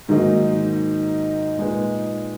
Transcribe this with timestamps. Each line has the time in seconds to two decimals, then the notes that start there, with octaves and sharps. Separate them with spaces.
0.09 G#2 D#3 F#3 A#3 D#4
1.57 A#2 G#3 D#4 G#4 B4